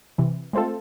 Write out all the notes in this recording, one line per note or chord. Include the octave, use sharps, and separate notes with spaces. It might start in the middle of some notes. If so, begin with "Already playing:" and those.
C3 E3
G#3 A3 C4 F4 A4